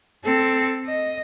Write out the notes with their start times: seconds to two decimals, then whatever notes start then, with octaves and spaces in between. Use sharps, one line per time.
0.24 C4 A4
0.86 D#5